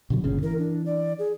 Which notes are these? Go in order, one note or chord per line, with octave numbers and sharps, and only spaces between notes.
B2 D3 F#3
G1 A#2 C#3
E3 A#4
D4
D5
G#4